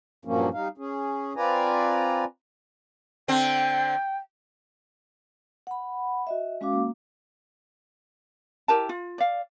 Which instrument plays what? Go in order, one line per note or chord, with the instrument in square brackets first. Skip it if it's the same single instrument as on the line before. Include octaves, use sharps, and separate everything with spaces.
[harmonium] G2 A#2 F3 F#3 A#3 C#4
G3 D#4 F5
C#4 G#4
C4 F4 B4 D5 G#5 A#5
[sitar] D3 C4 [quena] G5
[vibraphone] F#5 B5
F#4 D#5 E5
G#3 C#4 F#4 F5 D6
A#3
[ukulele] E4 G4 A#4 A5
F4
D5 F5